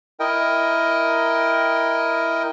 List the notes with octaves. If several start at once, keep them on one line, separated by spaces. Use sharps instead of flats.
E4 A#4 D#5 G5